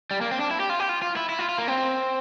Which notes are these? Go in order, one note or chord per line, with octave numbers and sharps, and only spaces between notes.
G3
A#3
C4
D4
E4
G4
F4
G4
F4
F4
E4
E4
F4
F4
A#3
C4